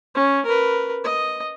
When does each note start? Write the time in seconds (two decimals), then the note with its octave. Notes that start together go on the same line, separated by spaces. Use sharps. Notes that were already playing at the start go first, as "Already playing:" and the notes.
0.15 C#4
0.46 A#4 B4
1.04 D#5